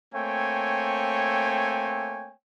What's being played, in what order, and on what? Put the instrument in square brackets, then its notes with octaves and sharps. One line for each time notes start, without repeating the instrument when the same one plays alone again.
[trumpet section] A3 A#3 C4 C#5 G5 G#5